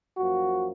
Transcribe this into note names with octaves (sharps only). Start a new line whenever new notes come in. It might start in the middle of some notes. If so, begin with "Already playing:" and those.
F#2 F3 A#3 F#4